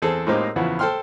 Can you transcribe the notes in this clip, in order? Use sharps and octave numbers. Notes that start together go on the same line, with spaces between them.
E2 C4 G#4 A4
A2 G#3 A#3 C4 D#4 G4
E2 C#3 F3 B3 E4 F#4
A4 C5 G5 C6 F6